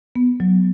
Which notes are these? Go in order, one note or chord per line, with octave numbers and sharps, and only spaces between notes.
B3
F#3